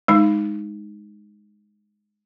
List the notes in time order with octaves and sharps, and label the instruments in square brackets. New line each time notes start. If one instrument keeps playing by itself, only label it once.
[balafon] G#3 D#4